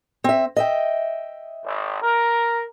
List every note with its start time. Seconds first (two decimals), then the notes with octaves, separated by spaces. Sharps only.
0.24 C4 E5
0.56 D#5 E5 G5
1.65 G#1
2.03 A#4